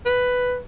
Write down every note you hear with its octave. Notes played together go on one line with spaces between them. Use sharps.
B4